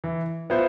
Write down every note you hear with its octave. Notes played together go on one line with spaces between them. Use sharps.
E3
B3 F4 C5 E5